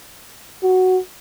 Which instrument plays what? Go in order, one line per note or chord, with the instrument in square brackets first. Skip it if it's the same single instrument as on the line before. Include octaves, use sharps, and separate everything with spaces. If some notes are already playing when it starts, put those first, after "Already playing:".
[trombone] F#4